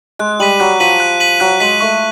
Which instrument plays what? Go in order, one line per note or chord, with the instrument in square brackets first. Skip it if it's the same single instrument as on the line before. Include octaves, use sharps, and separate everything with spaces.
[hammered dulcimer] G#3 [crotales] F#6
[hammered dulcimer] G3 [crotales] B6 D#7 F#7
[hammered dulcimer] F#3 [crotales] F#6
[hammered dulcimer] F3 [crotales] B6 D#7 F#7
[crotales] F#6
B6 D#7 F#7
[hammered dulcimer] F#3 [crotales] F#6
[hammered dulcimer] G#3 [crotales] B6 D#7 F#7
[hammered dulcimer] A3 [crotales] C#6